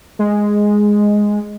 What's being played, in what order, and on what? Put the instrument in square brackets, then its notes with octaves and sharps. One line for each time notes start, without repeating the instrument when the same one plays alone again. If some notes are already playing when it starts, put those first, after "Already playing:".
[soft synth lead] G#3